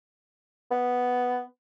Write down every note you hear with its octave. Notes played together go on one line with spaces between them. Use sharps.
B3